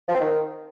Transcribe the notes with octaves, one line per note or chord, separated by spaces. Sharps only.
F3
C4
D#3